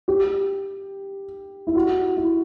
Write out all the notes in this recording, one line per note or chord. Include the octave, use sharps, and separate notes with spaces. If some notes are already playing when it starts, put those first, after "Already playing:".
G4
E4
F#4
E4